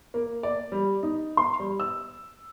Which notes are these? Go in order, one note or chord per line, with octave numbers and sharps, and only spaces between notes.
A#3
D5
G3
D#4
C6
G3
E6